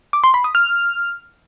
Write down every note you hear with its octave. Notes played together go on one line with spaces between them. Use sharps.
D6
C6
B5
D#6
F6